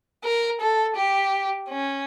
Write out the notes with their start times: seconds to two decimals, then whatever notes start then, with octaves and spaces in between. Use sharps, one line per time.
0.24 A#4
0.61 A4
0.96 G4
1.69 C#4